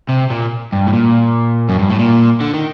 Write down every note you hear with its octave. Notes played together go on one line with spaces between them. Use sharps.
C3
A#2
G2
A2
A#2
F#2
G2
A2
A#2
D3
D#3